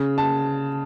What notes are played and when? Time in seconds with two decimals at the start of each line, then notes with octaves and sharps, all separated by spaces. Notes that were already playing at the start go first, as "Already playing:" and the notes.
Already playing: C#3
0.18 A5